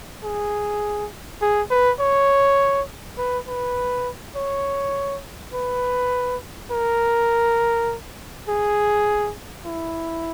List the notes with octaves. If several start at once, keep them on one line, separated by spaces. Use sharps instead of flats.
G#4
G#4
B4
C#5
B4
B4
C#5
B4
A#4
G#4
E4